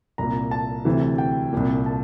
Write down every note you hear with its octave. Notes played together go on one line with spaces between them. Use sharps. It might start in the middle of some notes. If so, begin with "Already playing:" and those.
C2 A#2 A#5
A5
D2 C3 E3
G5
C2 A#2
A5